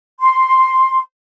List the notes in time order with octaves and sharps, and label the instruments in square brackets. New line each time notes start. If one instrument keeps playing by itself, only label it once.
[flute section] C6